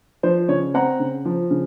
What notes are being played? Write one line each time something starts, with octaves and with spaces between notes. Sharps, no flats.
F3 C5
C#3 C#5
C4 F#5 A#5
C#3
F3
C#3